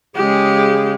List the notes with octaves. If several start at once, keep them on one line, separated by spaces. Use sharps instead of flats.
C#3 G#3 G4 G#4